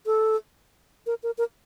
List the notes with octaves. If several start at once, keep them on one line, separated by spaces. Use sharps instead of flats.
A4
A#4
A#4
A#4